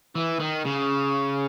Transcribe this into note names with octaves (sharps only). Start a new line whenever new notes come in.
E3
D#3
C#3